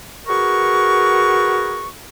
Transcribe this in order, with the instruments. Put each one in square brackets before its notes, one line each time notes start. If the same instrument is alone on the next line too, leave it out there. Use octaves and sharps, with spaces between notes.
[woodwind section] F#4 G#4 A#4 B4 C#6